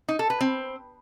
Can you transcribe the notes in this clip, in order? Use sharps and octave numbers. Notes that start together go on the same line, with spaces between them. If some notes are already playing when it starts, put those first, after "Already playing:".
D#4
A4
B4
C4